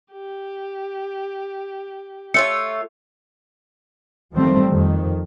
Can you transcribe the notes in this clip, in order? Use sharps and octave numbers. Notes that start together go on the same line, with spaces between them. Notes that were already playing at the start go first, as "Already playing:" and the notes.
G4
A3 F4 C#5 C#7
D#3 F3 G3 A3 C4
F2 D#3